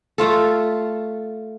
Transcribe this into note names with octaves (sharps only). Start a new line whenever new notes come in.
A3 F4 A4